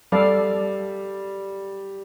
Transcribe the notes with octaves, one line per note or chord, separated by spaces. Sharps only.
G3 A4 D5 F5